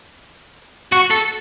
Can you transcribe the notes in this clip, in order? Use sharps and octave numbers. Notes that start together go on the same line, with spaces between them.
F#4
A4